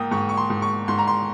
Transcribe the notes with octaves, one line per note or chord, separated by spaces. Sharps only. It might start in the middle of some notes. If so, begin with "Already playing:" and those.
Already playing: G#2 A#3 G5 D#6
G#2 C#6
C#6
C6
G#2
C#6
G#2 C6
A#5
C6